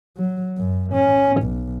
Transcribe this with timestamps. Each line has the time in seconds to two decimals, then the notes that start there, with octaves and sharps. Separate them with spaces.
0.18 F#3
0.58 F#2
0.93 C#4
1.42 B1